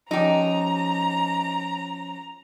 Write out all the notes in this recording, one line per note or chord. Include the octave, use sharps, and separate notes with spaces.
F3 C#4 D#4 G4 A#5